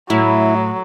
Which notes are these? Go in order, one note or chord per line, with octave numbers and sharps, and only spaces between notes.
A2 F#3 E4